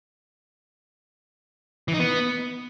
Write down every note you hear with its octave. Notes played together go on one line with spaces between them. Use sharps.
E3
D#4
B3